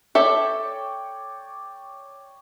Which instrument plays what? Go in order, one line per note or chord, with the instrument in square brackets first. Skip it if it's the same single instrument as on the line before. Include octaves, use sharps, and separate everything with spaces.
[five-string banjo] A4 E5 [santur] C#5 D5 G5